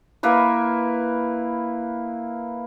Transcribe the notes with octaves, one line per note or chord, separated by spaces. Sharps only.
A#3 E4 B4